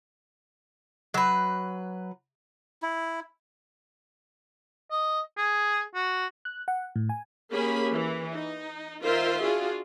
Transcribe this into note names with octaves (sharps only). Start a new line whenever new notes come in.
F#3 B4
E4
D#5
G#4
F#4
F#6
F#5
A2
G#5
A#3 C#4 G4 G#4 B5
E3
D#4
D#3 F4 A#4 C5 E5 C6
D4 F4 F#4 G#4